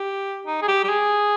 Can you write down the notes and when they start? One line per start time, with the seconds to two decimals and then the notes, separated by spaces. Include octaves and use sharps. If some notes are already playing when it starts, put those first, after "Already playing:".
Already playing: G4
0.47 D#4
0.62 G#4
0.68 G4
0.84 G4
0.89 G#4